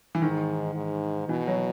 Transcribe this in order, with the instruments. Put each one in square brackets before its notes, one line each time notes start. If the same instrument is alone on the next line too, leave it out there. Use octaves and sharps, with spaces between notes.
[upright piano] E3
[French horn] G#2 [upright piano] D#3
[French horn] G#2
[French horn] B2 [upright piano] E3
[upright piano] F#3